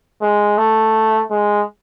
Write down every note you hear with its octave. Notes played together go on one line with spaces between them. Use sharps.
G#3
A3
G#3